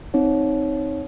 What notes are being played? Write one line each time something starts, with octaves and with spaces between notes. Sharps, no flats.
C4 D#4 C#5